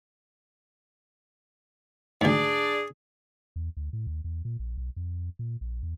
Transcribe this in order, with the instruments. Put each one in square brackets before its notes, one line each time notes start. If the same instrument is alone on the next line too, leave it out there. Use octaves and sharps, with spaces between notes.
[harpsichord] D2 G#2 [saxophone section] D4 G#4 D5
[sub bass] E2
D2
A2
D#2
E2
A#2
A#1
B1
F2
A#2
A#1
E2